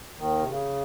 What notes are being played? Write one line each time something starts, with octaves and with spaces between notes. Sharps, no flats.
D#2 D#3
C3
C#3